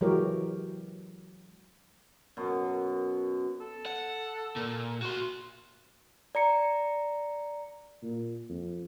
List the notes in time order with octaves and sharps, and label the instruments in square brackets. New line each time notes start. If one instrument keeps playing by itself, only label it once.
[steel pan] E3 F#3 G#3 G4 A#4 C#5
[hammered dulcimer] F#2 B2
[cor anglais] A4
[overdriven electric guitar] F#5
A#2
F#4 C6
[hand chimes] D5 A#5 C#7
[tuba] A#2
F2